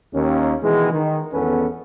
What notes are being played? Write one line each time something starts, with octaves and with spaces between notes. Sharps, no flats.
D#2 C#4
B2 D#3 E3 G#3
D#3
G#1 E2 B3 C#4 A4 B4